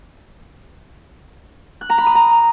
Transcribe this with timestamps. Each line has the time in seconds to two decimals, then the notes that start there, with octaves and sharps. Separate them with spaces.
1.81 F#6
1.90 A#5
1.98 B5
2.07 D#6
2.15 A#5